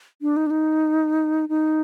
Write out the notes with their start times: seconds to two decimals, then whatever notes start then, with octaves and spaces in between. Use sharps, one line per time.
0.22 D4
0.36 D#4
0.47 D4
0.51 D#4
1.49 D#4